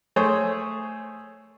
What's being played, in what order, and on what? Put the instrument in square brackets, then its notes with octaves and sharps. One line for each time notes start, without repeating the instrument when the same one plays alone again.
[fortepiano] A3 G#4 C5 C#5